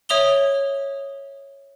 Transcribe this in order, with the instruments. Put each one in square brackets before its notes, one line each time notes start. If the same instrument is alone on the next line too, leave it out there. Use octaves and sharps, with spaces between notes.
[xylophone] C#5 E5 D#6 F7 G7